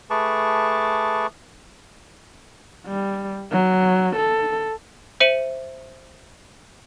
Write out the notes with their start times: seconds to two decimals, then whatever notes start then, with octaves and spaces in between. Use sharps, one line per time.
0.10 A3 G#4 B4 A5 C#6 D6
2.86 G3
3.52 F#3
4.16 A4
5.20 C5 E5 C#7 D#7 F#7